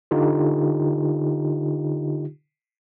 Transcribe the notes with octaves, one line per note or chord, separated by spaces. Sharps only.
D3 D#4 F4 G4